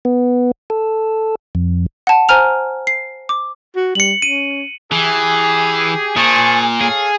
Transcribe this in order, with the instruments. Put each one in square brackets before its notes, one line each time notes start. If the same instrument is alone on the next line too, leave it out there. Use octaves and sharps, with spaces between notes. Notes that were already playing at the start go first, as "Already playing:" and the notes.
[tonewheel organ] B3
A4
F2
[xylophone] F#5 A5
C5 G#5 A#5 F6 F7
C7
D6
[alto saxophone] F#4
[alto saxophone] G3 [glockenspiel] C#7 F#7
[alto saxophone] C#4 [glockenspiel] D#7
[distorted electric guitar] E3 [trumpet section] G4 G#4
[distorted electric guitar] A#2 [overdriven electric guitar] G#4 [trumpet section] C5 A5 C#6
[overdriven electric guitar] G#4 [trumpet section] A4 C#5 F5